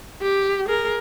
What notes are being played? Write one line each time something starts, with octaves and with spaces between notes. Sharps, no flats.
G4
G#4 A#4